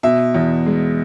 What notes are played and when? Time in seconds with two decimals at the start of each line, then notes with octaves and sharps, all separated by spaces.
0.03 B2 E5
0.35 E2
0.66 G#3